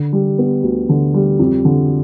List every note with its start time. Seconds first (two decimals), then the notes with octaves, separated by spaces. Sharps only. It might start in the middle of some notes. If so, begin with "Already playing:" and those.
Already playing: D3
0.13 G3
0.39 B3
0.64 D2
0.89 D3
1.14 G3
1.39 F2
1.65 D3